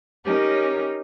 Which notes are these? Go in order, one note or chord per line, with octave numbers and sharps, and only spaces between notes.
C#4 D#4 G4 A#4 C#5